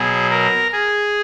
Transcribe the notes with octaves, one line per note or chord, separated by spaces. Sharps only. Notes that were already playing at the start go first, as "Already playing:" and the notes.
Already playing: B2 F#3 G#4
A#4
G#4